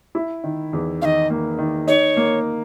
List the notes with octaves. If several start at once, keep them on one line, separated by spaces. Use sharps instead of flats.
E4
D#3
E2
D#3 D#5 F5
A#3
D#3
D#4 C#5
A#3